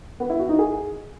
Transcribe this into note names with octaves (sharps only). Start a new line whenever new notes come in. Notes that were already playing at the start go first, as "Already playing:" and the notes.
B3
E4
F#4
D#4
G#4